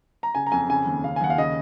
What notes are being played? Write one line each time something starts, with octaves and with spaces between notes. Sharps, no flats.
A#5
C#3 G#5
A#5
F2 G#5
C#3 G#5
D#2
C#3 F5
G#5
D#2 F#5
F5
C#3 D#5